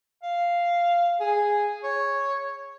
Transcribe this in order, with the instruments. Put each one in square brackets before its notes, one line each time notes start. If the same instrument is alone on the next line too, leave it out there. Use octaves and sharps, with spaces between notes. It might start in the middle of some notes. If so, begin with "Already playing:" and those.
[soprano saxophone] F5
G#4
C#5